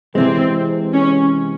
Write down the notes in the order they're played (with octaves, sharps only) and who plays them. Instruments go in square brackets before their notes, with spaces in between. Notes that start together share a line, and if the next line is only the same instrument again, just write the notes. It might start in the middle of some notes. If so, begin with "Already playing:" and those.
[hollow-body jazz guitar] C3 E3 G#3 [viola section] C4
[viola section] C#4